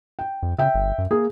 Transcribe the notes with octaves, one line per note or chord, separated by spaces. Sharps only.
G5
F2
C#3 E5 G5
G1
F#2
A#3 G#4